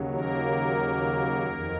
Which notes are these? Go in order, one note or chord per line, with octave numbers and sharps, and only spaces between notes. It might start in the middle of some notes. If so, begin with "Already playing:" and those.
Already playing: D#2 C#3 F#3
A#3 A#4
F2 D#3